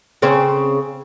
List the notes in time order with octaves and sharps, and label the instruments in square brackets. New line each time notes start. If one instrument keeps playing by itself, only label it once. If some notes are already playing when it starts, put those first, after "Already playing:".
[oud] C#3 C4 C#4